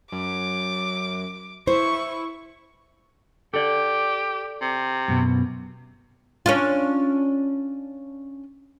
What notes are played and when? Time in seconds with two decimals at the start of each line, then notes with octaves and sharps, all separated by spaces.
0.12 F#2 D6
1.67 E4 C5 C#6
3.54 G4 A4 D5
4.61 C3
5.08 F#2 B2
6.46 C#4 D4 F4